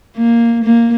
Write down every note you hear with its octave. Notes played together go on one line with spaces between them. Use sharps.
A#3
A#3